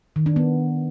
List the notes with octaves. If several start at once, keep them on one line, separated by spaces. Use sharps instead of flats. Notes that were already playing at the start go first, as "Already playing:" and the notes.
D#3
D4
B3